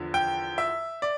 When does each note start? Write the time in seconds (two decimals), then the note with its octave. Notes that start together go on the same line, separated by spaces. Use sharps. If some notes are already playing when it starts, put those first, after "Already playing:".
Already playing: E2 D3 F3
0.14 G5
0.58 E5
1.02 D5